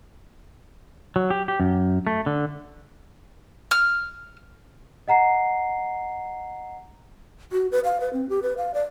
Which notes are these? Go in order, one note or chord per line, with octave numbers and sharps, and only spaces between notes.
F#3
G4
G4
F#2
A3
D3
F6
D#5 F#5 A#5 C7
F#4
B4
F5
B4
C4
G4
B4
F5
D5